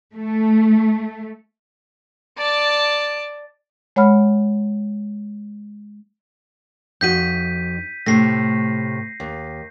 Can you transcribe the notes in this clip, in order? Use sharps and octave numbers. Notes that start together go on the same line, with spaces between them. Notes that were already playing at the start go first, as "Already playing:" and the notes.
A3
D5 A5
G#3 C#5 F#5 B5 F6
F2 D#4 F#4 G6 B6 D#7
A2 C3 A3 A#6 C7
D#2